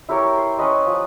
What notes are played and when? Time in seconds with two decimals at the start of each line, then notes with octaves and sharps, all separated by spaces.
0.09 E4 G4 A#4 C#5
0.38 C6
0.58 C#4 B4 D#5
0.86 F3